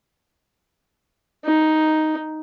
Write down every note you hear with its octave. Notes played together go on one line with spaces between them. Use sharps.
D#4